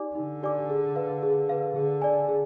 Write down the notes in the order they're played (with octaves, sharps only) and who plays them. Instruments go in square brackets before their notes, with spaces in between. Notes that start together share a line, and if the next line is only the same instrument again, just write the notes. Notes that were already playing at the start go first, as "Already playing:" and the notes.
Already playing: [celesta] D#4 G4 D5 G#5 D6
[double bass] D3 [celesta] D#4
[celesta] G4 D5 G#5 D6
G#4
B4 F5
G#4
B4 F5
[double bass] D3 [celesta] G#4
[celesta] D5 G#5
G#4